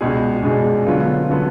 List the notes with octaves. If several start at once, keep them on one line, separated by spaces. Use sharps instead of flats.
C#2 B2 G#3 D4 G#4
C#2 B2 G#3 D4 G#4
D3 F#3 B3 F4 A4
D3 F#3 B3 F4 A4